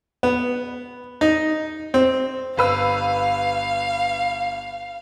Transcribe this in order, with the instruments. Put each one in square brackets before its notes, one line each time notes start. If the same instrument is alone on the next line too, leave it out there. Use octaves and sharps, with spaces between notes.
[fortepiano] B3
D#4
C4
[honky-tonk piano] G1 B4 E6 [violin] F5